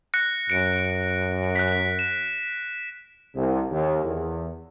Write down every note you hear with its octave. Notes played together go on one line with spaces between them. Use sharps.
F#6 A#6 C#7
F#2 C#7 D7
F#6 B6
E7
C2
D#2
E2